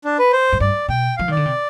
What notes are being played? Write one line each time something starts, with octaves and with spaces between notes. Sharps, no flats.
D4
B4
C5
G#2
G2 D5
B2 G5
F3 F5
D#3 D5
D3
C3